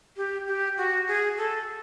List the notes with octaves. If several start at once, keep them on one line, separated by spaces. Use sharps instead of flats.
G4
G4
F#4
G#4
A4